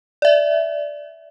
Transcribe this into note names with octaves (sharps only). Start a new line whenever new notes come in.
D5 E5